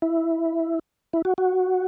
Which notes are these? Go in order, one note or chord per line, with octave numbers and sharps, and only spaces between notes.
E4
E4
F#4
F#4